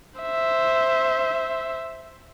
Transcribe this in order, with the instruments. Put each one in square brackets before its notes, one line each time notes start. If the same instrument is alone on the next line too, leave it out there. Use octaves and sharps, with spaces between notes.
[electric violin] C5 E5